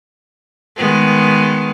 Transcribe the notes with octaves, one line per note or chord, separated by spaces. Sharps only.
D#3 G#3 B3